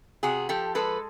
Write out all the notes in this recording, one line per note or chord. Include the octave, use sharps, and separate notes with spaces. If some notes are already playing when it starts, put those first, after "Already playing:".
C3 F#4 G#4
F3 G4 A4
G#3 A4 B4